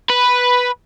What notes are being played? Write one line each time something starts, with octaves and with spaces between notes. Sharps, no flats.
B4